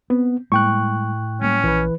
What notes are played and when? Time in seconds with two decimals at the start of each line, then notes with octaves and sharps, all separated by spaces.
0.10 B3 C4
0.52 A2 G3 G#3 A#3 G5 C#6 F#6
1.41 F#3 G3 A#3 C#4
1.64 A#1 E3 B4